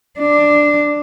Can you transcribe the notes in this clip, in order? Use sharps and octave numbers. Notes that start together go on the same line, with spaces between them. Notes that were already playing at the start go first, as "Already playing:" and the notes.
D4